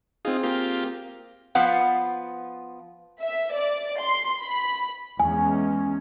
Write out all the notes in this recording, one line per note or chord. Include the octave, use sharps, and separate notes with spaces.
C4 D#4 F4 G#4
A#3 F4 G4
F3 B3 B4 F5 F#5
E5
D5
C6
B5
E2 G#3 C#4 G#5